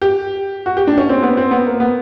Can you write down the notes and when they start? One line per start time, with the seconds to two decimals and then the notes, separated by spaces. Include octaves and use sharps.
0.02 G4
0.66 F#4
0.77 G4
0.87 D4
0.98 C#4
1.09 C4
1.23 B3
1.37 C4
1.51 B3
1.67 A#3
1.80 B3